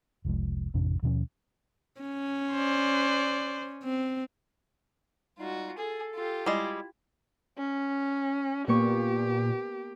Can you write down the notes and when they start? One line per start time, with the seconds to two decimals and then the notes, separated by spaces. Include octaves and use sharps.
0.25 F1 C2 F3 G#3
0.74 A1 F2 C3 D4
1.03 D#2 B2 F3 C#4
2.01 C#4
2.53 C5 D5
3.84 C4
5.38 G3 G#3 D#4 F4 F#4
5.78 G#4 A4
6.15 F4 G4
6.46 G3 G#3 E4
7.58 C#4
8.68 A#2 A#3 B3 G4 C#6